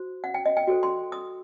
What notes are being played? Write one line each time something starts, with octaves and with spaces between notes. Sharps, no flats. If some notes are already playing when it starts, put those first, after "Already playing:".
Already playing: F#4 C5
F#5
G5
D#5
G5
F#4 A4 C5
C6
D#6